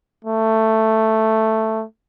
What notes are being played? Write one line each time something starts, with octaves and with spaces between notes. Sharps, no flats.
A3